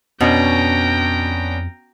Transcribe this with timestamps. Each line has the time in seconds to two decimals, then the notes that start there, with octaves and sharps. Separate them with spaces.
0.20 F2 B2 B3 C#4 D4 G5 A#5